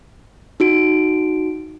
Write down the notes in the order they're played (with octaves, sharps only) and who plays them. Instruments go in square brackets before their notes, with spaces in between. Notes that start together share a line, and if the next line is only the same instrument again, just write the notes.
[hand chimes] D#4 F#4 D7